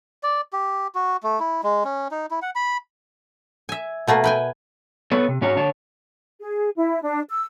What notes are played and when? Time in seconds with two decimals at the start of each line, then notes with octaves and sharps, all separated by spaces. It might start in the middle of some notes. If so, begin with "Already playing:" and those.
0.23 D5
0.53 G4
0.95 F#4
1.23 A3
1.40 E4
1.63 G#3
1.85 C#4
2.11 D#4
2.31 E4
2.42 F#5
2.55 B5
3.69 E5 G#5
4.07 B2 A3 A#3 B4
4.24 B4 G5 G#5
5.12 B3 A4 B4 C#5
5.28 C3
5.41 G#2 C#4 F#4 C#5 A#5
5.57 D3 C#5 A5
6.40 G#4
6.76 E4
7.02 D4
7.29 E6